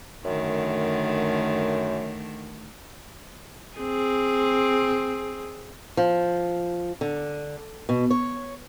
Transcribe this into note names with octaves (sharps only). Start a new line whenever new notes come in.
F#2 D3 D#3 A3
C4 G#4
F3
D3
B2
C#5